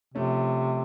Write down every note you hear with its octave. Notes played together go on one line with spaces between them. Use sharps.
C3 F3 A3 C#4